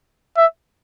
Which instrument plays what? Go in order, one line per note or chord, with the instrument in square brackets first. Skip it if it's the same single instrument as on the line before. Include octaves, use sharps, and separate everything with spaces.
[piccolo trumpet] E5